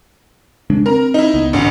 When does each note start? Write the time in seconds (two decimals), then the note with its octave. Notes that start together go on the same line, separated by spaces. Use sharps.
0.70 C#3 G#3 D4
0.86 C4 A#4 A#5
1.14 D#4 E4
1.34 C#2 B3
1.53 A1 D2